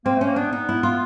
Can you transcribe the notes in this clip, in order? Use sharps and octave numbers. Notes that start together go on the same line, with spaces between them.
A#3 C4
A3
C#4
A#3
B3 D4
B3 D#4
E4
F4